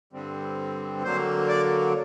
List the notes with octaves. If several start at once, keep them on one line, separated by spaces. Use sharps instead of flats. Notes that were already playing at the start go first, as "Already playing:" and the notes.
G2 D3 G3 C4
D3 F#3 A#3 C5
D5